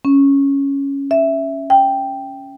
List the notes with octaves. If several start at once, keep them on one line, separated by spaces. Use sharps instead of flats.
C#4
E5
G5